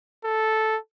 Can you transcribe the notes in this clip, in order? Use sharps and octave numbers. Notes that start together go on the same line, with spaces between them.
A4